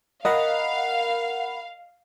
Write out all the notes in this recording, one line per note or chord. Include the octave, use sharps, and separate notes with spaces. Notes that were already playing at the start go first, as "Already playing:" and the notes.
A#4 D#5 F5 F#5 B5